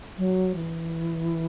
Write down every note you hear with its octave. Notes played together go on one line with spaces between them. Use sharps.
F#3
E3